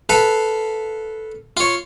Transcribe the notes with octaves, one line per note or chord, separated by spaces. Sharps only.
A4 B4 F5
F4 C#5